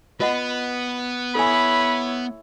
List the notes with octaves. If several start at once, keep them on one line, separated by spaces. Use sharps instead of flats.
B3 F4 D#5 F#5 B5
E4 A4 C#5 G#5 B5